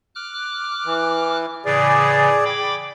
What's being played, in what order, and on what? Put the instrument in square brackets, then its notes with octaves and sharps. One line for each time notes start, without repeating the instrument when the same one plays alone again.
[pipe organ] D6 F6 F#6
[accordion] E3
[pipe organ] A2 C#3 E3 [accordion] G#4 D5
[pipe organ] G5 B5 D6